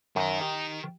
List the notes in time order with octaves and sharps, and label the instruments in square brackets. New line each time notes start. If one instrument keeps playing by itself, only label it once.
[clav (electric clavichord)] F#2 [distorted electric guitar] D#3 A#5
[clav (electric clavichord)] G4